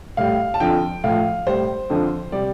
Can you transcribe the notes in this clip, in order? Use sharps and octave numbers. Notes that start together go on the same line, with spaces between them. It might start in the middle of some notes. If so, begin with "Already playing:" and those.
A2 G3 F5
A5
F2 D3 F3 G5
A2 F3 F5
A2 G3 C5
F2 D3 F3
C3 G3 D5